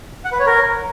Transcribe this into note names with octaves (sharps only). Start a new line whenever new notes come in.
F#5
B4
C#5
A#4